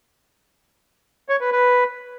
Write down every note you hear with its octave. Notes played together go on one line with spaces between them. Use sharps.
C#5
B4
B4